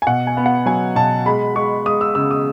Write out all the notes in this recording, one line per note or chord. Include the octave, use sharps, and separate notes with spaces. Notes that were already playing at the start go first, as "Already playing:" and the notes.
G#5
B2 F#5
G#5
B3
F#5
F#3 G#5
B2 A5
G#3 B5
G#3 C#6
G#3 D#6
E6
C#3 E6
D#6